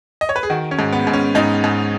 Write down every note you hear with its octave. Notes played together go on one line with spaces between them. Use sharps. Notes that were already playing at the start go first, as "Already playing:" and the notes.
D#5
C#5
B4
G#4
D#3 F#4
C#4
G#2
B3
G#2
C#4
G#2 D#4
G#2